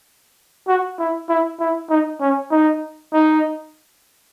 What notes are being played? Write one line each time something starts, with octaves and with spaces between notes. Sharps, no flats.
F#4
E4
E4
E4
D#4
C#4
D#4
D#4